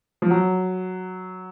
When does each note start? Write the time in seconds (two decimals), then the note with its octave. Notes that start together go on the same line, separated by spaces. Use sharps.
0.22 F3
0.30 F#3